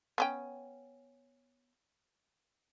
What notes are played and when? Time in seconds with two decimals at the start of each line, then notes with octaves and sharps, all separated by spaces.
0.18 B3 C#4 G5